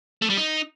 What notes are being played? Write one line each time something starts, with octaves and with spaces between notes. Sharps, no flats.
A3
G3
D#4